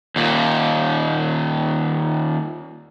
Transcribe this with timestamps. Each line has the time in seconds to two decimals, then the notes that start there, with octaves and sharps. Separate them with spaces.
0.16 D#2 A#2